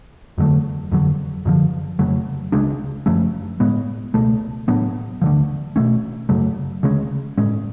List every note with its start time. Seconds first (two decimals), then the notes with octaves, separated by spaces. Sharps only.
0.38 F2 D3 F#3 A3
0.92 F2 D3 F#3
1.45 F#2 D3 F3
1.99 F2 C#3 F#3 A3
2.52 C#2 C#3 G#3 D4
3.06 F#2 F3 A3 C#4
3.60 A2 G#3 B3
4.14 C#2 B2 A3
4.68 A2 F#3 B3 D4
5.22 D2 D3 F3
5.76 B2 A3 C#4
6.29 F#2 C#3 F#3 A3
6.83 D2 C#3 G#3 C#4
7.38 A2 G#3 C#4